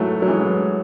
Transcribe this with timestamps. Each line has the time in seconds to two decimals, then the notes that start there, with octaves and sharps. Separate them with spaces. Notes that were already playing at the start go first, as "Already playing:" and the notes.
Already playing: G#2 E3 F#3 A3
0.22 F#3
0.28 E3 G#3